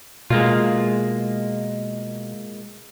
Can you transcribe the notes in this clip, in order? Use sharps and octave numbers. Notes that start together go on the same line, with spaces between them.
B2 G#3 A#3 F4